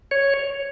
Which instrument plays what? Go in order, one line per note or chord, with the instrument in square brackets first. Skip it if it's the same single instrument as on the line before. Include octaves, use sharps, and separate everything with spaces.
[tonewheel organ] C#5